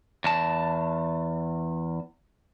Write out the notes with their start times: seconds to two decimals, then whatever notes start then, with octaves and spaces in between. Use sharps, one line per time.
0.24 E2 A5